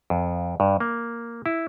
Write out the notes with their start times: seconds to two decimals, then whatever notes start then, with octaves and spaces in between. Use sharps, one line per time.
0.10 F2
0.60 G2
0.80 A#3
1.46 E4